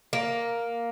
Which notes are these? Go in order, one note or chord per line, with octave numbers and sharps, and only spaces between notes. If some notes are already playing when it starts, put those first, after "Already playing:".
A#3